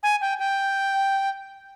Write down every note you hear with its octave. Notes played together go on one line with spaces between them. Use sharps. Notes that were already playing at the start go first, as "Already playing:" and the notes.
G#5
G5
G5